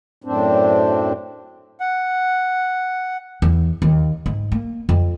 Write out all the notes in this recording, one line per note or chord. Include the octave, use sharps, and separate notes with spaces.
F#2 A2 C4 D4
F#5
E2
D#2
G#2
A#3
F2